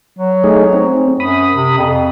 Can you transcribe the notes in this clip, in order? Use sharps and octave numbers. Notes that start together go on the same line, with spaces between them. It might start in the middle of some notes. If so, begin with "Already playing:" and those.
F#3
A3 D#4 G#4
C4
F#2 B5 D#6
C3
F2